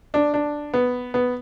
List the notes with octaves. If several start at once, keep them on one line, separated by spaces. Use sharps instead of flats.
D4
D4
B3
B3